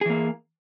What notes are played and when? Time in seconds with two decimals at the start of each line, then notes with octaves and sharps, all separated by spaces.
0.01 G#4
0.06 E3
0.10 A#3